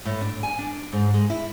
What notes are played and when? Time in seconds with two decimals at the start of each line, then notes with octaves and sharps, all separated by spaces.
0.05 A2
0.21 D4
0.43 G#5
0.59 D4
0.92 G#2
1.14 G#3
1.30 E4